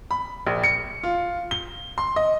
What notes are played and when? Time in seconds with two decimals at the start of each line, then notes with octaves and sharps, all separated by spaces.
0.11 B5
0.46 A#1
0.64 C#7
1.03 F4
1.51 G7
1.98 C6
2.16 D#5